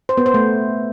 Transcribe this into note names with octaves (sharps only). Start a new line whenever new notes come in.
C5
B3
C5
A3